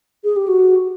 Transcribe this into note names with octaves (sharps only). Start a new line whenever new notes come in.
G#4
G4
F#4